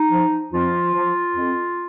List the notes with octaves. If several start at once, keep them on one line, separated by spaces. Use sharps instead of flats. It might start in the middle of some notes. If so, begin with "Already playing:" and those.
Already playing: D#4
F3
F2 F3 F4
F3
F2